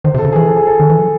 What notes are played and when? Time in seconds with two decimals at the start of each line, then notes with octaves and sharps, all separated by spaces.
0.04 D#3 C5
0.14 C3
0.18 A4
0.25 C#3
0.32 E3 G#4
0.46 A4
0.56 G#4
0.67 A4
0.80 D#3
0.90 E3
0.99 F#3